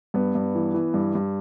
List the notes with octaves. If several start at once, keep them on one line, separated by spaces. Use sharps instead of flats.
G2 B3
G2
E3
E3
G2
G2